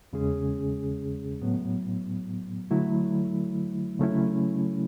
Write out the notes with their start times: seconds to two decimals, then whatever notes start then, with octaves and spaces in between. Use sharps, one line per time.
0.13 E2 C#3 G#3 C#4 G#4
1.42 A2 F#3 B3
2.71 D3 F#3 A3 E4
3.99 C#3 F#3 A3 C#4 E4